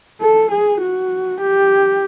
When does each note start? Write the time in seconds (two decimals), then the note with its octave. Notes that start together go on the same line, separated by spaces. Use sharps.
0.21 A4
0.51 G#4
0.81 F#4
1.41 G4